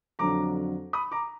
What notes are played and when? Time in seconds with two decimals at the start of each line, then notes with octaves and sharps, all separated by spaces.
0.19 F2 D3 F#3 D4 A#5 D6
0.93 B5 D#6
1.12 A#5 D6